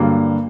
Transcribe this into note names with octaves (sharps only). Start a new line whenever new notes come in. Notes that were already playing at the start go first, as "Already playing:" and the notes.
Already playing: G2 D3 F#3 A#3